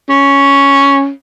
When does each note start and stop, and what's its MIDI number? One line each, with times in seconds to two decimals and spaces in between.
0.09 1.10 61